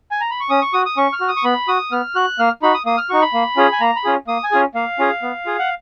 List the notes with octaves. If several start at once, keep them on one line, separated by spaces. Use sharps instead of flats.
G#5
A#5
B5
C#6
C#4 D#6
C#6
F#4 D#6
D#6
C#4 C#6
F6
F#4
D#6
C#6
B3 B5
F#4 D#6
B3 F6
F#4 F#6
A#3 F6
D#4 F#4 B5
D#6
A#3 D#6
F6
D#4 F#4 C#6
B5
A#3
C#4 F4 G#4
G#5
A#3 A#5
B5
C#4 F4 G#4
A#3 D#6
G#5
C#4 F4 G#4
A#3 F5
C#4 F4 G#4
B3
F4 G#4
F#5